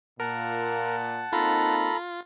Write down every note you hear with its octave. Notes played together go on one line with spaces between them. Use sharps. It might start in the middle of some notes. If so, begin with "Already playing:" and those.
A#2 A#4 F#5 A5
A#3 C4 D#4 F4 A4 A#5 B5